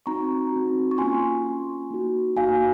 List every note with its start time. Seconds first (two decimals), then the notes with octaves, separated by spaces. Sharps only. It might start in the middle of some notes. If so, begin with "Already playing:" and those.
0.06 C4 D#4 F#4 A#5 C#6
0.52 C4 D#4 F#4
0.91 C#6
0.98 A#3 C#4 F4 G#5 C6
1.45 A#3 C#4 F4
1.90 A#3 D#4 F#4
2.36 A#3 D#4 F#4 F5 G#5